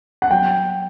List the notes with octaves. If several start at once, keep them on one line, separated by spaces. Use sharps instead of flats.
F#5
F#3 G5